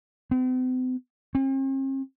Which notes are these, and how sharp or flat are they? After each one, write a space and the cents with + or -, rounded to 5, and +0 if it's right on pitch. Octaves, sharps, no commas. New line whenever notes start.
C4 -45
C4 +45